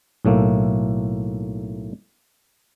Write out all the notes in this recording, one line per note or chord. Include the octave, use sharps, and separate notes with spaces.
B1 A2 A3 A#3